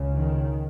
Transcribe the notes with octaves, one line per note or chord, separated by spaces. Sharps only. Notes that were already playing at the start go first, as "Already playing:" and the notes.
Already playing: C#2 C#3
D#3